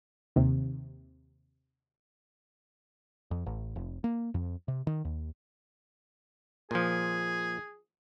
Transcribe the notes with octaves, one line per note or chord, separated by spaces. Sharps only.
D#2 C3
F2
A1
F1
A#3
F2
C3
D#3
D#2
A#2 F3 G#4